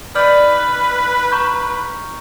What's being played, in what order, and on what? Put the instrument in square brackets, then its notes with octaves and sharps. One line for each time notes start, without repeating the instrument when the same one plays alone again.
[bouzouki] D#4 D5 [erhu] B4 [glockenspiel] F6 G6 F#7
[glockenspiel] A#5 C#6 G6